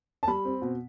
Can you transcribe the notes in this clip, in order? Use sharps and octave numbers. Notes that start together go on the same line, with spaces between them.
A5
G3 B5
C4
B2